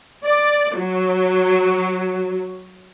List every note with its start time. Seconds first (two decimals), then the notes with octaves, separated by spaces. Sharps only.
0.25 D5
0.76 F#3